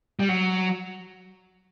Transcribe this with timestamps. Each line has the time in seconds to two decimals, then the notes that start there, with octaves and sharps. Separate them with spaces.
0.19 G3
0.29 F#3